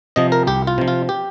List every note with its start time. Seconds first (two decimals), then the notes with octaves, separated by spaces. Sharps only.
0.16 C3 F3 D#5
0.32 A#4
0.47 C2 G4
0.67 F4
0.78 C3 F3
0.88 F4
1.09 G4